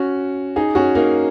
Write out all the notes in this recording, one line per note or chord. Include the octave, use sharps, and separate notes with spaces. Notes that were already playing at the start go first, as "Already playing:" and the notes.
Already playing: C#4 F#4
D#4 G#4
C#4 F#4
A#3 D#4